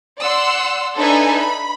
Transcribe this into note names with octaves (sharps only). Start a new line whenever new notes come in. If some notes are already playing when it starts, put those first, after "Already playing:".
D5 F#5 C6 E6
D4 D#4 A4 B4 E5 G#5
B5